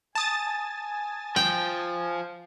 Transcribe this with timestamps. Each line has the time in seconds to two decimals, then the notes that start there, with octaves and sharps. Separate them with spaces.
0.15 G#5 A5 D#6 A6
1.36 F3 G5